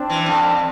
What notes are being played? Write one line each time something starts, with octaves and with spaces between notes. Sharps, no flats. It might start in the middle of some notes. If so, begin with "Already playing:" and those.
Already playing: C4 D4
E3
F2
F2